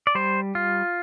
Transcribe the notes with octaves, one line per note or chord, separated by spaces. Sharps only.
D5
G3 C5
F4